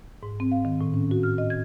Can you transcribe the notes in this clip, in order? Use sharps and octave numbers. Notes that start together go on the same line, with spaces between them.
G#2
C4
F5
D#3
A2
C#4
F#4
F6
D#5
G#6